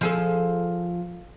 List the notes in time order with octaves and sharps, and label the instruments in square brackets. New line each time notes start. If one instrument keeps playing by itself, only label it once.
[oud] F3 G#4 A4